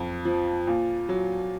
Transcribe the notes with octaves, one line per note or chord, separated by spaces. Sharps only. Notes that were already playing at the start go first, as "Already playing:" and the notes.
Already playing: F2
F3
A#2
F#3